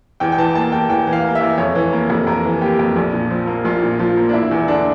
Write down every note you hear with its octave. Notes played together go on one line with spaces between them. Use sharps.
E2 G5
G5
E3 A5
A#3 A5
E2 G5
E2 G5
E3
F5
A#3
E5
E2
F2 C#5
E3
A#3
F2
F2 A#4
E3
A#3 G4
F2
A#1
A#2
F3
A#3
A#1 F4
A#2
F3 F4
A#3
D4
E1 E4
E2
D3 D4